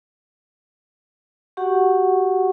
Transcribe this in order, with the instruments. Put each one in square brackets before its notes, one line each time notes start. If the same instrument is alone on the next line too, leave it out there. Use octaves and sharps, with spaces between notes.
[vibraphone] F#4 G4 F#5 C#6